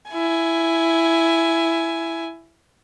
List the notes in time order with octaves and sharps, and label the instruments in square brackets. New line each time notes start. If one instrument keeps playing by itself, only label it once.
[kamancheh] E4 G#5